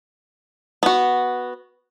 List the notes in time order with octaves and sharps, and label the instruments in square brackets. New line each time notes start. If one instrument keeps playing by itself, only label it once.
[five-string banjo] B3 F#4